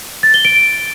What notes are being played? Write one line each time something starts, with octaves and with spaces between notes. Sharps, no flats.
A6
G7
D7